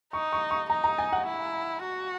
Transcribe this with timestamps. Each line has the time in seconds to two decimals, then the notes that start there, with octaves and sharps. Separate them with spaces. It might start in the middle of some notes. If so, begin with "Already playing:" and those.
0.13 D#4 C#6
0.33 C#6
0.51 C#6
0.70 D#4 A#5
0.84 A#5
0.98 G#5
1.12 F#5
1.27 E4
1.84 F#4